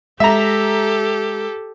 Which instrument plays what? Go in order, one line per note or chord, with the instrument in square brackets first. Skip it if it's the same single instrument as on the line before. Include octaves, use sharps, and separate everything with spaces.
[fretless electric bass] G#3 [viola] G4 A4 [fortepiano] E5 A#5